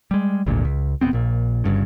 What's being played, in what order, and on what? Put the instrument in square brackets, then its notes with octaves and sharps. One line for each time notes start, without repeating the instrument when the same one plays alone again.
[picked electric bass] G3 G#3
G#1 D2 G2 A#2
C#2
E1 C2 B3 C4
A#1 A#2
G1 G2 C#3